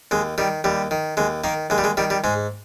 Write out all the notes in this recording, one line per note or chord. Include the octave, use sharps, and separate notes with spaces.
D#2 G#3
D#3 G3
D#2 G3
D#3
D#2 G#3
D#3 A#3
D#2 G#3
G3
G#3
D#3 G3
G3
G#2 G#3